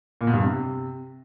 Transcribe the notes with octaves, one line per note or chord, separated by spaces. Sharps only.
A#2
B2
G2
C3